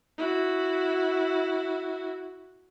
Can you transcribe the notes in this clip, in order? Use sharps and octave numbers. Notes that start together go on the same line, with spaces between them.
E4 F#4